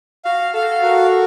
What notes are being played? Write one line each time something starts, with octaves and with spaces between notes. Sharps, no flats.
F#4 F5
A4 F5
F#4
A4
F#4 A#4